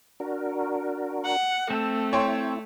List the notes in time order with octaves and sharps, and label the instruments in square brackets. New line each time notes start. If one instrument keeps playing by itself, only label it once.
[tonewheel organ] D4 F#4 A#4
[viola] F#5
[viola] A3 [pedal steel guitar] C4 A4
[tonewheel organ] E4 [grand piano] C#5 G5 C6